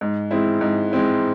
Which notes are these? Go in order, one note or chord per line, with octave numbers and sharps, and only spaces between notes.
G#2
G#3 C4 E4
G#2
G#3 C4 E4